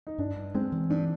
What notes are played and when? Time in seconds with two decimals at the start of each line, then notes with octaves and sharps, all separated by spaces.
0.07 D#4
0.18 G2 D4
0.36 G2
0.55 G#3 C4
0.72 E3
0.90 G2 D4